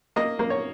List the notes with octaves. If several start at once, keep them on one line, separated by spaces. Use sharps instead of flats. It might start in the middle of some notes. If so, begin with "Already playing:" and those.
A#3 D#5
A#3
C#5